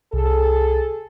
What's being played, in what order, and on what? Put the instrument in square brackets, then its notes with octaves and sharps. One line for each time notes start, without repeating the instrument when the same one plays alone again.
[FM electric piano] C2 [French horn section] G#4 A4